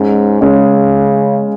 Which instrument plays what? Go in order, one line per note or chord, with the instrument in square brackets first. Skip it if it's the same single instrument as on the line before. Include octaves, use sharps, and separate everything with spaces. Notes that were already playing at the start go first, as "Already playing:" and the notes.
Already playing: [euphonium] G#2 [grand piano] G#3 C#4
[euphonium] C#3 [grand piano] G#3 C#4